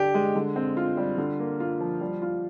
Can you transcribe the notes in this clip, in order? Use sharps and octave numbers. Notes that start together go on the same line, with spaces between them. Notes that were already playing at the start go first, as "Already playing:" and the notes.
Already playing: D3 D4 G4
G#3
D3
C4
F4
G3
D3
A#3
F4
F3
G3
F4